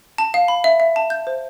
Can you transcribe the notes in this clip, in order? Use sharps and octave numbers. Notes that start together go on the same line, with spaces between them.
A5
F5
B5
E5
E5
A5
G6
C5